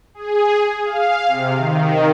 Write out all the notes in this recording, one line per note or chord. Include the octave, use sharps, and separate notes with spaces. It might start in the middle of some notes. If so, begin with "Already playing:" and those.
G#4
F5
C3
D#3